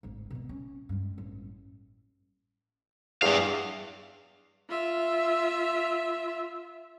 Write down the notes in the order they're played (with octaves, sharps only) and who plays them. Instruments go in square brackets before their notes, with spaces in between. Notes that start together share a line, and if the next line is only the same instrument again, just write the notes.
[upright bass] D1 G#1
B2 E3
C#4
G2 G#3
A1
[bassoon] E2 [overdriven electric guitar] G2 F5
[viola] F4 E5